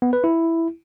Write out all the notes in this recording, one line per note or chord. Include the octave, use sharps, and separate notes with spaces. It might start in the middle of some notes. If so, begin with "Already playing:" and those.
B3
B4
E4